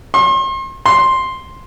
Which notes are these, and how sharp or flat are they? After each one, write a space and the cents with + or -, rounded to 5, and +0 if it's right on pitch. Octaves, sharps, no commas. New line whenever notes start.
C6 +40
C6 +5